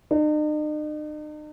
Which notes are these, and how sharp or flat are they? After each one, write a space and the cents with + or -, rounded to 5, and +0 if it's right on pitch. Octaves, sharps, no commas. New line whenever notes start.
D#4 -45